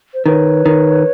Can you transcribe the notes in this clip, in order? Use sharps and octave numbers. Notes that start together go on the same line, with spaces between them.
C5
D#3 B4 C#5
D#3